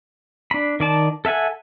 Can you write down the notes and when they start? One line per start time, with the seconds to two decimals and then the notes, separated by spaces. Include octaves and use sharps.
0.51 D4 B5
0.80 D#3 D5 A5
1.25 A4 E5 F#5 G#5